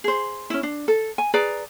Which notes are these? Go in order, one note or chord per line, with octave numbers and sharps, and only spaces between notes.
G#4 C5
C#4 E4
D4
A4
G#5
G#4 B4 D5 A#5